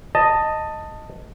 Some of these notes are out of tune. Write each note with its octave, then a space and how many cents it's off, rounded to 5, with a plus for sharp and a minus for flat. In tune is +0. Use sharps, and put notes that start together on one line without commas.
D#5 +0 A5 +15